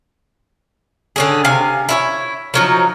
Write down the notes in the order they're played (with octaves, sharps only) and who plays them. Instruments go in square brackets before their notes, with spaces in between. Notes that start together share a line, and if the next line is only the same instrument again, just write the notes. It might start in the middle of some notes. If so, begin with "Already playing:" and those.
[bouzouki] D3 C#4 G#4
C3 F5 G#5
E4 F4 C#5
F3 F#3 D#4